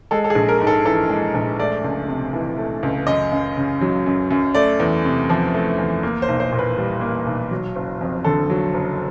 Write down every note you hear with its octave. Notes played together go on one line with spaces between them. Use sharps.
G#3 A4
A4
G#4
A#1
A#4
G#2
A4
E3 A4
G#3
A#1
A3 D5
C#2
C3
E3
A3
C#2
F#2 D#5
F#2
C#3
F#3
F#2
F#2
A3 D5
E2
C3
F3
A3
E2
A#3
C5
B1
C5
A#2
B4
G3
A#3
B1
F#3
F#1
F2
D3 A4
F#3
F#1